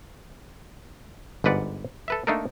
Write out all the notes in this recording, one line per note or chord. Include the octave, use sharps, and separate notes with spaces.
G1 G#2 B4 D5 F#5
A4 B4 E5
A3 A#3 D4 D#4 A4 A#4